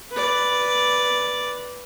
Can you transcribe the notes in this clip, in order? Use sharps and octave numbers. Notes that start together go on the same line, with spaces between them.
B4 D5